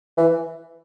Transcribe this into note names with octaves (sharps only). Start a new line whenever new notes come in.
E3